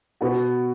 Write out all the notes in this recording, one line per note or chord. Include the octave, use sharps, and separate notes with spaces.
B2 B3 F#4